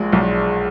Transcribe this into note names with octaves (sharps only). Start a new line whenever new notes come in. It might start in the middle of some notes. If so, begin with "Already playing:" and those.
Already playing: A#1 G#3
B1